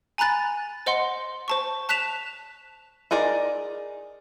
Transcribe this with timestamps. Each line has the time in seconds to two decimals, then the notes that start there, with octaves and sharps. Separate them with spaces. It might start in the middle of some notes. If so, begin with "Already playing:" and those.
0.18 G#5 A#5 B5 F#6 A6
0.86 C5 D#5 F#5 C6
1.48 C5 A5 C#6
1.89 A5 F#6 B6 E7 F7
3.11 D#4 G#4 A#4 D5